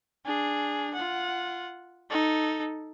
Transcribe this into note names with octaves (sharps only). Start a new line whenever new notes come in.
D4 G#4
F4 F#5
D#4 A4